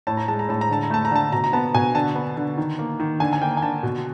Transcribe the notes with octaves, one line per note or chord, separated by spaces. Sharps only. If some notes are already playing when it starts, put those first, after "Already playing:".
A2 A5
A#5
G#3 A5
A#5
A2 A5
A#5
D3 A5
A#5
A3 A5
A#5
D3 A5
B2 A#5
A#5
B3 A5
B2 G#5
D3 A5
B3
D3
D#3
A#3
D#3
D3 G#5
G#5
A#3 G5
G#5
D3 A5
B2